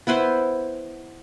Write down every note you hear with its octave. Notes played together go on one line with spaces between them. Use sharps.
B3 E4 B4 C5